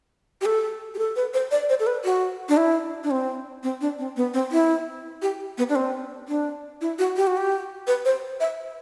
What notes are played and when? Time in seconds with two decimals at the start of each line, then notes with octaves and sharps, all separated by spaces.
0.41 G4
0.45 A4
0.95 G4
0.98 A4
1.16 B4
1.34 C5
1.51 D5
1.69 C5
1.80 A4
1.87 B4
2.05 F#4
2.49 D4
2.57 E4
3.04 D4
3.11 C4
3.63 C4
3.81 D4
3.99 C4
4.16 B3
4.34 C4
4.51 E4
5.22 G4
5.58 B3
5.69 D4
5.75 C4
6.28 D4
6.81 E4
6.99 F#4
7.16 G4
7.27 F#4
7.37 G4
7.87 B4
8.05 C5
8.40 E5